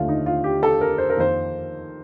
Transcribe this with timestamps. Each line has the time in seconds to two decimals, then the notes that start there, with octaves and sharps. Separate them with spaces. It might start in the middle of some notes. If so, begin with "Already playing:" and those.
Already playing: D#2 D3 A3 F4
0.08 D#4
0.26 F4
0.44 G4
0.63 A4
0.81 A#4
0.98 C5
1.10 A#4
1.17 F2 D#3 A#3 C5